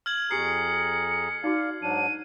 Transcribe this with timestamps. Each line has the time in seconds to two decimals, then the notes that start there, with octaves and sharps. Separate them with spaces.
0.06 F6 G#6 F#7
0.31 F2 G4 G#4 A#5 D#6 C7 C#7
1.44 D#4 F#4 D5 F5
1.82 G#2 F#3 D4 D#7